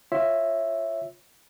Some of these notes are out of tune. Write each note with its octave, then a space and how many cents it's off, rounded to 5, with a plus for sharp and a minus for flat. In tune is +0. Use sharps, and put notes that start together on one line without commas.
F4 +0 C#5 -15 E5 +0